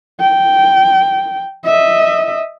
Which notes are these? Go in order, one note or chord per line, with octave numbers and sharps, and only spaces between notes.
G5
D#5 E5